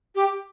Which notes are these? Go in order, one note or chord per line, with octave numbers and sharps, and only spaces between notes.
G4